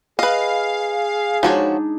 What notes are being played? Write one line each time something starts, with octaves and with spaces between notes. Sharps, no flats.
G#4 B4 D#5 F5
F3 G#3 D4 D#4 F#4 C#5